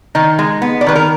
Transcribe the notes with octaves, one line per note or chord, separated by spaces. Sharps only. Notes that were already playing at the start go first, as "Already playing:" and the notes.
D#3 D#4
G#3
B3
D5
D#3 B4
A#4